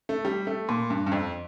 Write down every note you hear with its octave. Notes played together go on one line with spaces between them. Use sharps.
A3
G3
A3
A#2
G2
G2
F2